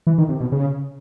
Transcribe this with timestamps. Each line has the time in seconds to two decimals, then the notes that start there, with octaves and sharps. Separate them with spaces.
0.07 E3
0.18 D#3
0.29 C3
0.40 B2
0.52 C#3